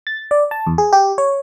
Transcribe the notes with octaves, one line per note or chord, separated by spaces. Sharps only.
A6
D5
A5
E2
G#4
G4
C#5